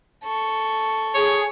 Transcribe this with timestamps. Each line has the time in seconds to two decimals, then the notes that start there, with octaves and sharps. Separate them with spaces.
0.24 A4 C#6
1.15 G#4 C#5